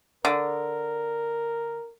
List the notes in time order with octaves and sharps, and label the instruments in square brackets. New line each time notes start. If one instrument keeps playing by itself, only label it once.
[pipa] D3 [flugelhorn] A#4